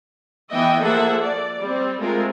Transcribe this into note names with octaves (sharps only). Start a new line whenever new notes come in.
E3 B3 D#5 E5 G5
F3 A#3 G#4 A4 E5 F#5
D5
G3 C4
G#3 A3 C4 F4 A#4